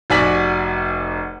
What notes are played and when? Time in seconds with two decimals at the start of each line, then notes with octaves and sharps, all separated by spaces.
0.10 F1 F#4 D5 G#5 B6 F#7